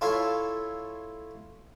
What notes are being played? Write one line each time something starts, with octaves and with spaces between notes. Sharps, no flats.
E4 F4 A4 C#5 E5 F5